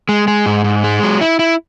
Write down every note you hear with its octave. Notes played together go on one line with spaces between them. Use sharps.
G#3
G#3
G#2
G#2
G#3
F#3
E4
E4